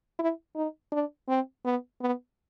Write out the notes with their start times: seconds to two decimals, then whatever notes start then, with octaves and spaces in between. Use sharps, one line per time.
0.19 E4
0.55 D#4
0.92 D4
1.28 C4
1.65 B3
2.01 B3